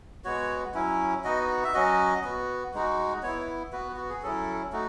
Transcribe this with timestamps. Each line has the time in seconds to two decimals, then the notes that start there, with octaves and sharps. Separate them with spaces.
0.24 G#3 B3 F#4 C#5
0.74 F#3 C#4 E4
1.24 B3 D#4 F#4 D#5
1.64 E5
1.74 F#3 C#4 F#4 D#5
2.24 B3 F#4
2.74 G#3 D#4 F#4
3.23 B3 E4 C#5
3.72 B3 F#4 B4
3.96 F#4
4.09 G#4
4.23 F#3 C#4 E4 A4
4.73 A3 D#4 F#4